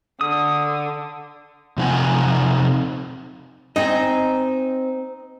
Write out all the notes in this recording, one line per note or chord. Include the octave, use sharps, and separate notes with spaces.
D3 D#6
C3 F3 C4 D#4 F#5 G#5
C4 D#4 D#5 G5 G#5